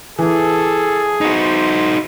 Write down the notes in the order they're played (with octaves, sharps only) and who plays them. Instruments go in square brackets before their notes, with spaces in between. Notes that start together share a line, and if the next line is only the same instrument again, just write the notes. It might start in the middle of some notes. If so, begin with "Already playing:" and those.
[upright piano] E3 [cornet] G#4 [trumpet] A4
[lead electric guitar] D#4 F#4 [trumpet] C5